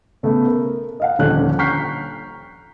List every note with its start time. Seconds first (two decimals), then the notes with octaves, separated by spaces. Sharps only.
0.23 C#3 A3 B3
0.48 A#4
1.00 D#5 F5 F#5
1.19 D#1 D3 F3 C#4 F#6
1.59 A#5 C#6 F6 G6 B6 C7